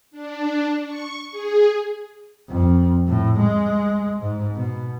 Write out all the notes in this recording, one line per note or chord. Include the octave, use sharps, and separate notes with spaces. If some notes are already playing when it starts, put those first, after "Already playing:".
D4
C#6
G#4
F2
A2
G#3
G#2
B2